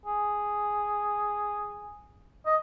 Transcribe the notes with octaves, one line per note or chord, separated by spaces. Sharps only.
G#4
D#5